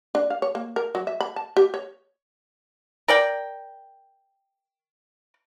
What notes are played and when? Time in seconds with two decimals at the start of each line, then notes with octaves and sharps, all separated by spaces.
0.15 D4
0.30 F5
0.42 C#5
0.55 A#3
0.76 A#4
0.95 F#3
1.07 E5
1.21 B5
1.36 A5
1.57 G4
1.74 C#5
3.08 A#4 D5 G5